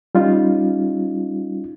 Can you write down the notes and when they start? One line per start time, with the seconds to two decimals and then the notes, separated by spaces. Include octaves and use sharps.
0.15 G3 C#4 D#4 F4